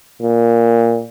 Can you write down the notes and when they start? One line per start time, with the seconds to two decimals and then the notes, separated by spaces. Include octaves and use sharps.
0.22 A#2